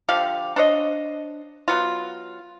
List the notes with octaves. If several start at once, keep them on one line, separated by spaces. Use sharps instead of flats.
D3 F3 G4 F5
D4 C5 C#5 D#5
F#3 B3 F4